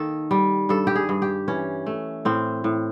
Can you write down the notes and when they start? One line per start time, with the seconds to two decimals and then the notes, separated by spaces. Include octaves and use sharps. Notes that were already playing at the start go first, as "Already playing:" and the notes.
Already playing: D#3 A#3 A4
0.31 G3
0.69 G2 A4
0.87 G4
0.96 G#4
1.09 G2
1.22 G4
1.48 E3 C#4
1.86 A3
2.25 A2 C4
2.64 A2